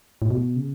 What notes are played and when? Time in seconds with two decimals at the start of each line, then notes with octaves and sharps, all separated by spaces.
0.22 A2
0.30 B2
0.56 C#3